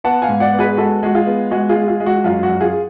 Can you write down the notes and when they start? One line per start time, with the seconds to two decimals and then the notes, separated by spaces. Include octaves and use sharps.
0.04 B3 F#5 A5
0.22 F5 G#5
0.29 G#2
0.40 D5 F#5
0.53 B3
0.59 G#4 B4
0.77 G#3 F#4 A4
1.03 G#3 F#4
1.15 F4 G#4
1.26 B3
1.51 G#3 F#4
1.69 F4 G#4
1.75 G#3
1.88 F4 G#4
2.00 G#3
2.06 F#4
2.24 F#2 F4
2.43 F#4
2.49 F#2
2.61 F4 G#4